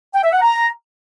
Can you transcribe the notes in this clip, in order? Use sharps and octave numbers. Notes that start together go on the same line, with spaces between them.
G5
E5
F#5
A#5